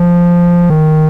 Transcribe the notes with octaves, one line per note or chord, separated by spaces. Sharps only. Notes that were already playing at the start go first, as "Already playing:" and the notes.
Already playing: F3
D#3